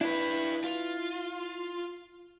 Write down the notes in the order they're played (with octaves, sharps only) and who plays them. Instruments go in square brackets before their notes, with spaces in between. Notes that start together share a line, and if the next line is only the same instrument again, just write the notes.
[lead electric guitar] D4 B4 [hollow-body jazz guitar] E4
[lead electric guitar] F4